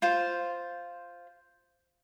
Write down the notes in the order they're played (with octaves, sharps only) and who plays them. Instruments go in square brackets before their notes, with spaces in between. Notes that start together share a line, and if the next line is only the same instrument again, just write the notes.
[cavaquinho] F4 C5